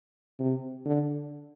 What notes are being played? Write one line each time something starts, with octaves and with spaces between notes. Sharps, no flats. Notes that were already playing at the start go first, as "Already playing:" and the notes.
C3
D3